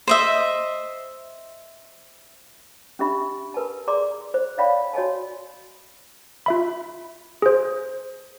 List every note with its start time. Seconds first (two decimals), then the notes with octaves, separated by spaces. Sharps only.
0.07 C5 D#5 E5
2.99 C#4 D4 G4 E5 B5
3.54 A#4 B4 G#5 A5
3.88 G#4 D5 A#5 C6 D6
4.34 C5
4.58 C#5 D5 E5 F5 G5 B5
4.94 F#4 C#5 D#5 G#5 A5
6.46 F4 E5 B5
7.42 G#4 C5